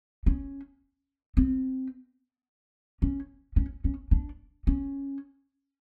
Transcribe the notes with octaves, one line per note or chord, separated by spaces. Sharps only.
C#4
C4
C#4
C#4
C#4
D4
C#4